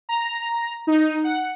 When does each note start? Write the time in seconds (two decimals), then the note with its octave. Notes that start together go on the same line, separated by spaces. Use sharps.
0.09 A#5
0.87 D#4
1.23 F#5